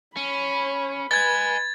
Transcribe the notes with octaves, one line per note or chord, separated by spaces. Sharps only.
C#4 C#5 B5
B4 D#5 G#5 G#6 A6